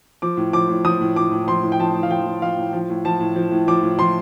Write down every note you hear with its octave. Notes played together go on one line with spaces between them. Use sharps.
F3 D6
A2
F3 D6
A2
F3 D#6
A2
F3 D6
A2
F3 C6
A2
G5
F3 A5
A2
F5
F3 G5
A2
F3 F5
A2
F3
A2
F3 A5
A2
F3
A2
F3 D6
A2
F3 C6